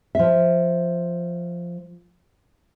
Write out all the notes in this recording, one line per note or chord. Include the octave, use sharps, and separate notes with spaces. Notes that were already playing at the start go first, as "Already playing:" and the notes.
F3 E5